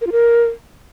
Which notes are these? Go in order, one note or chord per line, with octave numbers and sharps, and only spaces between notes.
A#4
F4
A#4